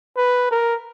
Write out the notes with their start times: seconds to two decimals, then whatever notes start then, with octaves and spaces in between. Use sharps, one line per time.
0.17 B4
0.51 A#4